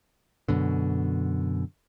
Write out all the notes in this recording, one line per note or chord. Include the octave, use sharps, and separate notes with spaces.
F#2 B2 D3